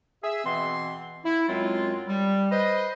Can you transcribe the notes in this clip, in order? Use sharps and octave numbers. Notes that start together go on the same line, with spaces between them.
G#4 E5
B2 E3 C4 C6
E4
F#2 F#3 G#3 C4 F4
G3
B4 C5 D#5